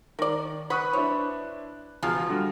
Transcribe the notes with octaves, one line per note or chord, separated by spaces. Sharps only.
D#3 A#4 D5
B4 F#5 B5 C#6 D#6 F#6
D4 E4 C5 C#5
E1 E2 F3 F4 G#4 F6
D3 G3 F#4